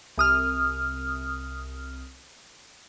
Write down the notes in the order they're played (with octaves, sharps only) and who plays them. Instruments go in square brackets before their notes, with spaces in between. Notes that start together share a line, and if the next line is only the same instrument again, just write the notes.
[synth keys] C2 D#6 F6